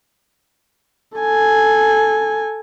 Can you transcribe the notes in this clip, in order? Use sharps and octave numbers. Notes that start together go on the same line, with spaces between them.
A4 G#5